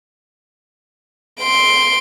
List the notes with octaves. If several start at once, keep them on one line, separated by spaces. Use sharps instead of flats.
C6 D7